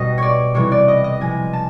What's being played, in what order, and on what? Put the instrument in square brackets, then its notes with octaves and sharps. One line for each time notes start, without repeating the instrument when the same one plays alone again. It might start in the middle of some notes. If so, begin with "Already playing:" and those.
Already playing: [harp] B2 G3 D#5
C#5 D5
C3 E3 G3 C#5
D5
D#5
D#5
C3 F3 G#3 G#5
A5